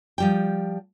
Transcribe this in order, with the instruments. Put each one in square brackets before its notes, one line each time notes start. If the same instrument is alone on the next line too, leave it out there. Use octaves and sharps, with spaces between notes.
[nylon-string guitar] F3 G3 G5